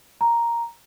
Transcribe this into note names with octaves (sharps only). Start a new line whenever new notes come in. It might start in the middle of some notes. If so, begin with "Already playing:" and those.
A#5